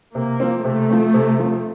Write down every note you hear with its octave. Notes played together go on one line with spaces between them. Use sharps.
C3 A#3
F3 C4
C3 A3
F3 C4
C3
F3 C4